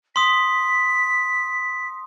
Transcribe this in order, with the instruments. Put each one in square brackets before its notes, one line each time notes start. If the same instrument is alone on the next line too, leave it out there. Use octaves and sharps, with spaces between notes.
[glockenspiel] C6 D#6 [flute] B6